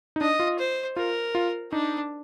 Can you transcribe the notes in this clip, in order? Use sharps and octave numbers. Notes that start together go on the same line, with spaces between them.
D#4
D4 D#5
F4
C5
F4 A#4
F4
D4 D#4